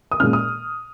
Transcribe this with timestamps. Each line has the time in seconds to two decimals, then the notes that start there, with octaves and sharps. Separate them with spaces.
0.12 D#6
0.20 A#2 G#3 C#4 F6
0.33 D#6